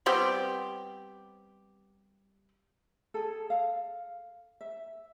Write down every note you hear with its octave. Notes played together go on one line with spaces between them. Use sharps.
G3 B3 C4 G4
G#4 A4
F5
E5